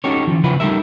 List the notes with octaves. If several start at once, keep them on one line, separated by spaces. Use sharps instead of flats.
C#4 D#4 F#4 G4 A4 C#5
E3 F3
C#3 F3 E4 B4 F#5
G3 D#4 G4 A4 A#4 E5